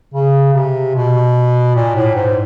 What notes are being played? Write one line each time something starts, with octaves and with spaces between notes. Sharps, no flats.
C#3
C3
B2
A#2
A2
G#2